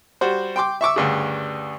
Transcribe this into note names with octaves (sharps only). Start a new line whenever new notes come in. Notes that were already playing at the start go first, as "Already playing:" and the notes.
G3 F#4 C5
G5 C6 D6
E5 C#6 D6 E6
D2 G2 C#3